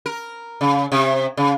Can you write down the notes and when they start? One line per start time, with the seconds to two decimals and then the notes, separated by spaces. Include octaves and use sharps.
0.06 A#4
0.61 C#3
0.92 C3
1.37 C#3